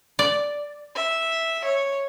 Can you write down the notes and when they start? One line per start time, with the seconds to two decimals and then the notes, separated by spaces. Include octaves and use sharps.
0.19 D5
0.95 E5
1.64 C#5